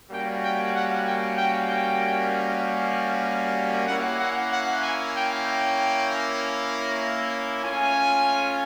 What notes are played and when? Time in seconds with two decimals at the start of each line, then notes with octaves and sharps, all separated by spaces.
0.11 G3 A#3 C#4 F#4 G5
0.42 G5
0.73 F#5
1.05 G5
1.36 G5
1.68 G5
3.87 A#3 C#4 E4 F#5
4.19 F#5
4.50 F#5
4.81 G#5
5.13 G5
5.44 G5
7.63 A3 C#4 F4 G#5